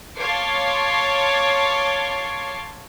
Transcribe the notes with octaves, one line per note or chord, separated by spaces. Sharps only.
C#5 F5 A5 C6 D6